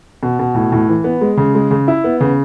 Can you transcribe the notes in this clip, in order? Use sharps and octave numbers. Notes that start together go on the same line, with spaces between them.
B2
B2
A2
A2
E3
B3
G#3
C#3
G#3
C#3
E4
B3
C#3